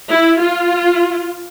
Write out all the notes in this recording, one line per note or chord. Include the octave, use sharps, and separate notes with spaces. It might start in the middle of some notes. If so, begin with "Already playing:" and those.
E4
F4